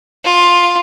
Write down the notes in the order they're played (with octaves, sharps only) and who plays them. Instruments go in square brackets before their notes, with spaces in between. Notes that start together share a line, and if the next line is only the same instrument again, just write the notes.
[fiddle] F4